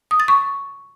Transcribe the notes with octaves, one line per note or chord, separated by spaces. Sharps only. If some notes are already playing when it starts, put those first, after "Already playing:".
D#6
A6
C#6